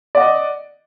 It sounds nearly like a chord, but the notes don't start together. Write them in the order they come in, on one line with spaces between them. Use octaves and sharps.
D5 F#5 D#5